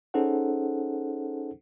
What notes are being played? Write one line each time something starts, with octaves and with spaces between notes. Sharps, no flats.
C#4 D#4 G#4 A4 C5 F#5